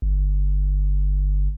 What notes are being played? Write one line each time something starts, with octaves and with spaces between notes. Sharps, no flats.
G1